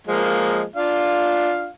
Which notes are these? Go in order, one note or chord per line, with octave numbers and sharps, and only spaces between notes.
F3 G#3 A#3
D4 F4 F5